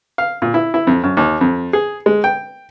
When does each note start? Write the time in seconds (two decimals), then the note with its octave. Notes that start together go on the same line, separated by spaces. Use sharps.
0.18 F5
0.42 A#2
0.54 E4
0.74 E4
0.87 F2
1.03 F#2
1.17 D#2
1.41 F2
1.73 G#4
2.06 G#3
2.24 G5